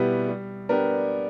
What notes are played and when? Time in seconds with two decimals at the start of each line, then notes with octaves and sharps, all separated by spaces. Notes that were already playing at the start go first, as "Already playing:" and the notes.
Already playing: B2 G3 B3 E4 G4
0.28 G3
0.69 B3 D4 G4 A#4